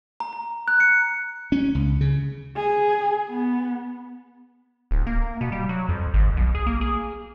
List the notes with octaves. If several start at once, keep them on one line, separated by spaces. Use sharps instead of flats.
A#5
A#5
F#6
C#7
C#4
C#2
C#3
G#4
B3
D1
A#3
B2
G3
F#3
F2
G#1
B1
G#4
A#3
G#4